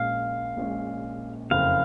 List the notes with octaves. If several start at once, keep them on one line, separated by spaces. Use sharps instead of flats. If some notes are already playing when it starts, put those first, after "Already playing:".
Already playing: A#1 A#2 G#3 C#4 F5
A#1 A#2 G#3 C#4
F#1 F2 C#3 F5